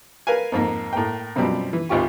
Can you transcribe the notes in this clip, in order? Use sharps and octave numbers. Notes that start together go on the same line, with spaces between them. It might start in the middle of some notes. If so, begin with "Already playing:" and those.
A#4 B4 F5 G#5
F2 G#2 A#3
A2 A#3 G5
F#2 B2 F3 G3 C4
E3
G#1 D2 F4 G4 C#6